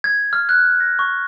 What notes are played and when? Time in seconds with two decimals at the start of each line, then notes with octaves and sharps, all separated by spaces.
0.04 G#6
0.33 F6
0.49 F#6
0.80 A#6
0.99 C#6